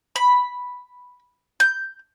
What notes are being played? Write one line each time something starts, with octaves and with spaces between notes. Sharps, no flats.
B5
G6